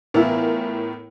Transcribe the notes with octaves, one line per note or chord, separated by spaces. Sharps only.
A2 E3 B3 E4 F4 A#4